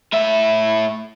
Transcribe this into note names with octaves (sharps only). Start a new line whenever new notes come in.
A2 E5